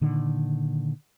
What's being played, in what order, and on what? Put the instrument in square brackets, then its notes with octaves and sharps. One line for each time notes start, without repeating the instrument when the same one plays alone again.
[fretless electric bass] A#2 D3 D#3